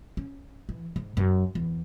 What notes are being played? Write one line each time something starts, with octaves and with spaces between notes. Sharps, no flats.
C#4
E3
G#2
F#2
E2